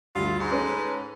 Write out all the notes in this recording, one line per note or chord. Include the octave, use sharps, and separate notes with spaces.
D2 G2 F4
G#2
C#4 A4 B4